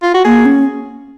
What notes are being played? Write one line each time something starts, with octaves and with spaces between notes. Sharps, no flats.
F4
F#4
A#3 G#4
C#4